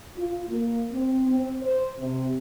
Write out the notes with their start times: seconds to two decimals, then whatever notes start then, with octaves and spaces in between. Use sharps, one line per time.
0.17 F4
0.50 A#3
0.92 C4
1.29 C4
1.63 C5
2.00 C3